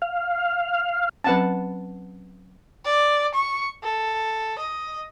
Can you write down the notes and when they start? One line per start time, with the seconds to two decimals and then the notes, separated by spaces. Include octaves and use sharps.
0.02 F5
1.24 F#3 C4 C#4 B4 F#5 A5
2.85 D5
3.34 C#6
3.83 A4
4.58 D#5